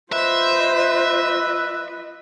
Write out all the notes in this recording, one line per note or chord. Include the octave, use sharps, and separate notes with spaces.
F4 B4 C5 D#5 E5